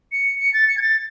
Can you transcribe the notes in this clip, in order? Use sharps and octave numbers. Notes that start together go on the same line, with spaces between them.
C#7
C#7
A6
C#7
G#6
A6